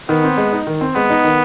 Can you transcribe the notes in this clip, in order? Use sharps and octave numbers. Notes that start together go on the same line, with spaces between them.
D#3 B3
C4
G#3
D#4
D#3
C4
G#3 B3
D#4
D#3